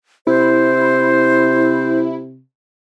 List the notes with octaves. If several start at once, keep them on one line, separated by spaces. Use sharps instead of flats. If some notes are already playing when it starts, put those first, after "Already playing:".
C3 E4 C5